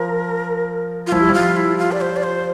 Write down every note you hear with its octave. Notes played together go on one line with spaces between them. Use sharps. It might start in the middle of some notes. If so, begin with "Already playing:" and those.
Already playing: F3 A#4
F4
F3 E4
G3
F3 F4
E4
F4
D5
C5
D5
C5